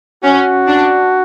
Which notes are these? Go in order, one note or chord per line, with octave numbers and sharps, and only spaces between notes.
C#4 F#4
D4